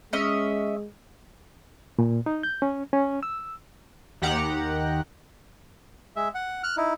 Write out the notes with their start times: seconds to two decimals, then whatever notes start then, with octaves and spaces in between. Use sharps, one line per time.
0.13 G#3 C#4 D#5 E5
1.99 A#2
2.26 D#4
2.43 G6
2.62 C#4
2.93 C#4
3.23 E6
4.22 D#2 D#3 G4 F#5 A#5
6.16 G#3 E5
6.34 F#5
6.63 F6 F#6
6.77 D#4 E4